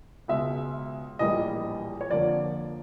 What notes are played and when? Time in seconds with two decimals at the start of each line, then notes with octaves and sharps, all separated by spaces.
0.28 C#2 B2 G#3 E5
1.19 A#1 A2 E3 G3 A#3 D#5
2.01 C#5
2.09 F2 D3 F3 A#3 D5